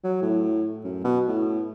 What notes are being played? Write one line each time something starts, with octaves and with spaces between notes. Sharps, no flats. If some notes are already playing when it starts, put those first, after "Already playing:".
F#3
A2
F#2
B2
A2